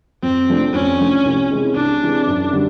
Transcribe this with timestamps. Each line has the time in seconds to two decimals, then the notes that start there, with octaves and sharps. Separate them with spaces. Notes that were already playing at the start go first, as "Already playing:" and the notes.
0.22 F2 C4
0.48 C3 F3 A3 D4
0.73 F2 C#4
1.00 C3 F3 A3 D4
1.25 C2
1.51 C3 E3 G#3
1.75 C2 D4
2.01 C3 E3 G#3
2.27 F#2
2.53 D3 G3